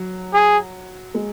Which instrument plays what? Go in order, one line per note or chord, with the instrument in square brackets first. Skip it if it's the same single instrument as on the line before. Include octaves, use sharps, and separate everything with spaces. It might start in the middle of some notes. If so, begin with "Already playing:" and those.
Already playing: [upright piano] F#3
[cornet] G#4
[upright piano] G#3